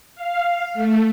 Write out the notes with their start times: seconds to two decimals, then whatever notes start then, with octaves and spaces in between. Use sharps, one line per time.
0.15 F5
0.74 A3